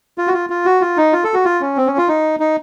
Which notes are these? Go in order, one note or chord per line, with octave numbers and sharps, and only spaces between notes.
F4
F#4
F4
F4
F#4
F4
D#4
F4
A4
F#4
F4
C#4
C4
C#4
F4
D#4
D#4